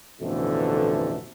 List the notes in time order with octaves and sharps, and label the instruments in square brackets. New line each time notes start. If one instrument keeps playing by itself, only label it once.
[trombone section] A1 F2 B2 D3 E3 A3